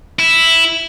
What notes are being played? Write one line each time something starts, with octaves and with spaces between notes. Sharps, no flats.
E4